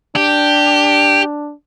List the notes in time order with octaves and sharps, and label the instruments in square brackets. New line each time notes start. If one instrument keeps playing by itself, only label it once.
[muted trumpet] D4 [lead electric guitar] G4